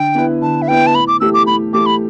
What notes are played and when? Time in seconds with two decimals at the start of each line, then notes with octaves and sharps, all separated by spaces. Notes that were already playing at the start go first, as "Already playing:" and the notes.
Already playing: D3 G5
0.15 B3 E4 B4
0.42 D3 A5
0.62 E5
0.68 B3 E4 B4 G5
0.87 A5
0.94 A2 B5
1.08 D6
1.20 E3 A3 G4 E6
1.34 D6
1.47 A2 B5
1.73 E3 A3 G4 D6
1.86 B5